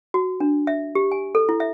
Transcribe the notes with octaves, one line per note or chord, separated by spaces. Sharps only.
F#4
D4
E5
G4
G#5
A4
E4
E5